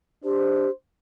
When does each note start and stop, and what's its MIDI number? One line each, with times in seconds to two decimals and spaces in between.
0.25 0.71 62
0.25 0.70 67
0.25 0.71 72